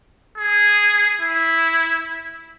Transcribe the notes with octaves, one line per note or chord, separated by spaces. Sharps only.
G#4
E4